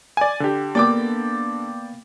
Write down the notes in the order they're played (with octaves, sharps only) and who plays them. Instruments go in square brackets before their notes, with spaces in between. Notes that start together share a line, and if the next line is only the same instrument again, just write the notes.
[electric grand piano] D5 G#5
D3 G4
[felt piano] A#3 B3 [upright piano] D5 G5 D6